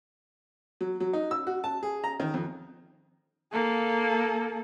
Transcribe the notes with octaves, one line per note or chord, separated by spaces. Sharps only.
F#3
F#3
D#4
E6
F#4
A5
G#4
A#5
D#3
F2
A#3 A4